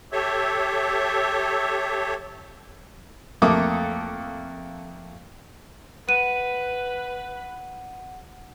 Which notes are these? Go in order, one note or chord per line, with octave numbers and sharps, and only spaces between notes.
G4 A4 C#5 E5
F2 A3 A#3 A4 D6 D#6
B4 F#5 D#7